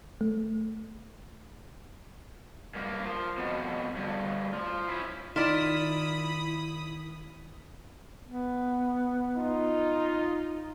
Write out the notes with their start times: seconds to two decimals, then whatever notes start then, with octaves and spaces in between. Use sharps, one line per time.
0.21 A3
2.75 G2 A#3
3.04 F3
3.37 F2 B2
3.96 D2 G2
4.54 F3
4.89 C#4 E4
5.36 D#3 E4 F4 A#4 D5 B5 D#6
8.27 B3
9.37 D#4 F4